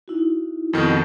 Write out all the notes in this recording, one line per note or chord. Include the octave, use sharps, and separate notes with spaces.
D#4 E4 F#4
F2 B2 D#3